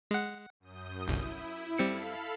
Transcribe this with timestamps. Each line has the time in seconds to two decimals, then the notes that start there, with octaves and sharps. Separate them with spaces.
0.11 G#3 F#5
0.60 F#2 D#6 G6
1.08 G1 C2 E4
1.78 G3 C4 A4 F5 B5 C#7